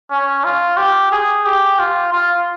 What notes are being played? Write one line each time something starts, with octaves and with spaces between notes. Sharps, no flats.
C#4
F4
G4
G#4
G4
F4
F4